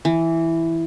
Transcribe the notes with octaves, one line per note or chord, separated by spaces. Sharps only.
E3